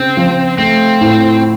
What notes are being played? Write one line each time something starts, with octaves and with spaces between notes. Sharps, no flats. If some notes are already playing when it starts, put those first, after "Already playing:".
Already playing: C#3 C4
F3
A3 C4
A2